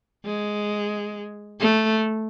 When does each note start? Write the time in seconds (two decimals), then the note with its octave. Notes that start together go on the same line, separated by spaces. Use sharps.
0.25 G#3
1.60 A3